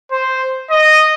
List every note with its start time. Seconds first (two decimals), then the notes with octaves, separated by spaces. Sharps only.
0.11 C5
0.70 D#5